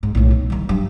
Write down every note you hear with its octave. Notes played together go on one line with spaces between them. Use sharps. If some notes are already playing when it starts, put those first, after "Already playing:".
G#2
B1 A2
D#3
D#3 G3
G2 F#3